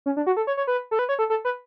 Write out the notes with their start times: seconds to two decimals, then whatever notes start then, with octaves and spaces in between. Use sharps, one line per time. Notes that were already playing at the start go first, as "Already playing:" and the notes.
0.06 C#4
0.17 D4
0.26 F#4
0.37 A4
0.47 C#5
0.57 C#5
0.67 B4
0.91 A4
0.99 B4
1.09 C#5
1.19 A4
1.30 A4
1.45 B4